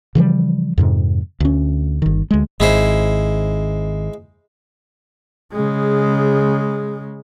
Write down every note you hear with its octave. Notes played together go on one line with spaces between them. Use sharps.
C#3 E3 F3 G3
F2 G#2 C3
D2 C#4
G1 D#3
D2 G#3
G#1 G#3 E4 C5
C#3 G#3